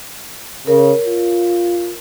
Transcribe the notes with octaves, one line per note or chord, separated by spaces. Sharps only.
C#3 A#4 C#5
F4